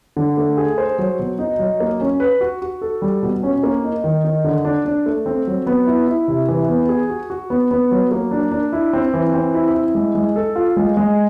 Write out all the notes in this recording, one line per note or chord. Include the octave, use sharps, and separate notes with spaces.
D3
A3
G#4
C5
F#3
B2
D#4
F#3
A#3
C#4
B4
F#4
F#4
A4
G3
B2
C#4
A#3
D#4
D#3
D#4
D3
D4
D4
A3
C4
F#3
B3
E4
E4
C3
E3
B3
G#4
F#4
F#4
B3
B3
F#3
A#3
D4
D4
E4
C4
E3
C4
E4
E4
G#3
G#3
A4
F4
G#3
G#3